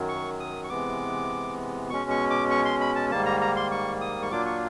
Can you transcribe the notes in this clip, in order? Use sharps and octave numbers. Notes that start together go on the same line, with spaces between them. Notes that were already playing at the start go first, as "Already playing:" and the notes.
Already playing: F#2 D#3 F#3
C#6
D#6
C#6
C3 E3 G#3 B3 D6
B2 G#3 C#4 C#6
C#6
D6
C#6
C6
B5
A5
G#2 D#3 G3 A#3 A5
A#5
A#5
C6
C#6
D#6
C#6
A#2 F#3 A#3 D4 F4 D6
C#6